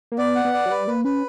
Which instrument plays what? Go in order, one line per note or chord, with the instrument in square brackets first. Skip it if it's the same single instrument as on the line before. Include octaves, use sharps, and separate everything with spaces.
[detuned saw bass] A#3
[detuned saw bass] B3 [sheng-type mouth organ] D5
[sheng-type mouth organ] F#5
[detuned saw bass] B3
[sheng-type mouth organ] D5
[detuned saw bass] F#3
[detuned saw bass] G3 [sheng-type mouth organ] B4
[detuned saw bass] A#3 [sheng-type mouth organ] B4
[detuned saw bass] C#4 [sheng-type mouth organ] B4